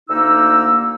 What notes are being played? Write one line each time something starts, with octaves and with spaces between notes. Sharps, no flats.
D2 A#3 D#4 E6